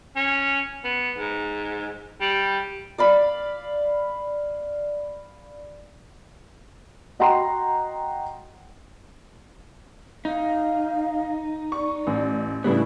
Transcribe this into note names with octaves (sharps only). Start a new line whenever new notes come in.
C#4
B3
G#2
G3
D5 F5 B5
F#4 D#5 F#5 G5 A#5 C6
D#4 F5
D5 C#6
A1
A2 C#3 G3 B3 D4 E4 B4